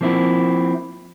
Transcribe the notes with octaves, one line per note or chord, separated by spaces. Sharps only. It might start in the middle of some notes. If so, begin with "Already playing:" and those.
F3 A#3 C4 E4